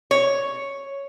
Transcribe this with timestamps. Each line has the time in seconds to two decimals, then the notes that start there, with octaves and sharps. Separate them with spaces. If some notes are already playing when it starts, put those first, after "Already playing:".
0.11 C#5